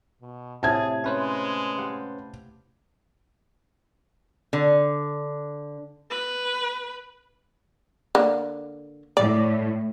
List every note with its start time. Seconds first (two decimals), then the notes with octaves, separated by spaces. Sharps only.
0.22 B2
0.63 A2 C3 G#4 A5 G#6
1.04 G#3 C#4 B4 C5
1.78 G4 F5 F#5
4.53 D3
6.11 B4
8.15 D3 A#3
9.17 A2 D5